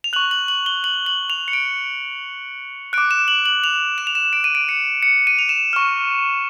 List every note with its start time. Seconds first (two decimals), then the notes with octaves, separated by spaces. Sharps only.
0.04 F7
0.13 C#6 F#6 F#7
0.31 F#7
0.48 F#7
0.66 G7
0.84 F#7
1.06 F#7
1.30 F7
1.48 C#7
1.53 D7
2.93 D6 F#6 D7
3.11 E7
3.28 F#7
3.46 F#7
3.64 F7
3.98 E7
4.07 F7
4.15 E7
4.33 D7
4.44 D#7
4.55 D7
4.69 C#7
5.03 C#7
5.27 D#7
5.39 F7
5.49 E7
5.73 C#6 F6